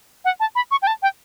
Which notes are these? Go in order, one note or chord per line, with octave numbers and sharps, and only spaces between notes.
F#5
A5
B5
C#6
G5
A5
G5